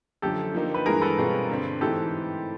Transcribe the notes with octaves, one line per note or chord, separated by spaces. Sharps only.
F#2 D3 F3 G4 A4
D3 F3 A#3 D#4
B4
G2 E3 G#3 G#4 A#4
A4 B4
B2 G3 C4 F4 G#4
G2 D3 G3 C4
G#2 E3 A3 C4 G4 A4